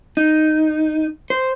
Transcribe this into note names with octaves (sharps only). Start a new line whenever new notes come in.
D#4
C5